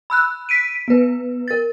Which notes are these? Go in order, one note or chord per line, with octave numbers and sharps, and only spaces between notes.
B5 E6 F#6
B6 D7 D#7
B3 B4
A#4 A6